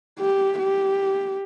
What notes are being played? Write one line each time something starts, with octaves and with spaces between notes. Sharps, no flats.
G4
G4